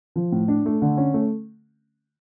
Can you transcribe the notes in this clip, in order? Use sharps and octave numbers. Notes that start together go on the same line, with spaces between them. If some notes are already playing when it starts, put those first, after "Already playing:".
F3
A2
D4
A3
D3
C#4
A3